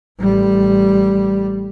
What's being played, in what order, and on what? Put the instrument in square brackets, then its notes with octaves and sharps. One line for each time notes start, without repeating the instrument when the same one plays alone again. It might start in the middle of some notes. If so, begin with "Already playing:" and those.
[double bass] A1 G3